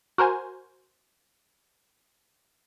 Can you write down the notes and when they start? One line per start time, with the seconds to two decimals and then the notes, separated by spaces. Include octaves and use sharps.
0.18 F#4 A#4 C5 G#5